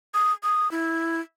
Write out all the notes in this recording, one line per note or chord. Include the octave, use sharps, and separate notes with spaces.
D#6
D#6
E4